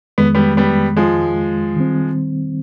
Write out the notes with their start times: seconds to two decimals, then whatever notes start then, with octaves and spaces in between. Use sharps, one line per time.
0.18 F2 D#3 G#3 B3
0.35 G3 B3
0.57 G3 B3
0.97 F3 G#3
1.76 D#3 G3 C4